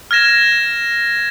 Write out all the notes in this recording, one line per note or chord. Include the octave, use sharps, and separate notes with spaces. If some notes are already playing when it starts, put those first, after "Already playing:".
F6 G#6 A#6 E7